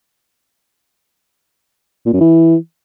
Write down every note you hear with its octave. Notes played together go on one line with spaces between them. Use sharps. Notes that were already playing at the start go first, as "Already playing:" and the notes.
A#2
F#2
E3